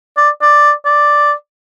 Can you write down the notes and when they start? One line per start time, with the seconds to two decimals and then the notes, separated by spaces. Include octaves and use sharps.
0.17 D5
0.42 D5
0.85 D5